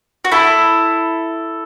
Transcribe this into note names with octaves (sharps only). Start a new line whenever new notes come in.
F#4
E4 A4